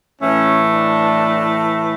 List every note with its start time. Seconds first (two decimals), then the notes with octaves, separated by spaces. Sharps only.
0.22 A2 E3 A3 C#4
0.74 D4